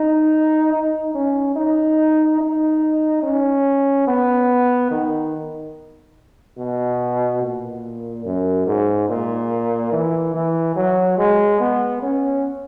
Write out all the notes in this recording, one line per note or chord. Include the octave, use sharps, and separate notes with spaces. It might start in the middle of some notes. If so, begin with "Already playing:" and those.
Already playing: D#4
D#4
C#4
D#4
D#4
C#4
B3
D#3
B2
A#2
F#2
G#2
A#2
E3
E3
F#3
G#3
B3
C#4